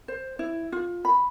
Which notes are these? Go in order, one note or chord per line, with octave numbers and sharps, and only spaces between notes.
C5
E4
F4
B5